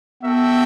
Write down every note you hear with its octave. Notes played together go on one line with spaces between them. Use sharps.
B3 F#4 A4 E5 G5